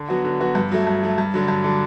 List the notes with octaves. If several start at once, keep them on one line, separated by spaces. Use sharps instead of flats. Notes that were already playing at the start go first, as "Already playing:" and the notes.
Already playing: D3
F#3 B3 F#4
D3
F#3 B3 F#4
G2
F#3 A3
G2
F#3 A3
G2
D3 F#3
G2
D3 F#3